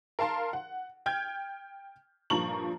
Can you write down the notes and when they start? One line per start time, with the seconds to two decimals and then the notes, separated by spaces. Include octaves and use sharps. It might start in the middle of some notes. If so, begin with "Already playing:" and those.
0.19 A#4 F5 A5 C6
0.53 F#5
1.06 G5 F6 G6 G#6
2.30 G2 A#2 F3 A#5 C#6 F#7